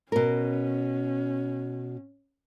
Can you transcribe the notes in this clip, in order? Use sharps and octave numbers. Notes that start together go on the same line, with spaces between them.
B2 C#4 A#4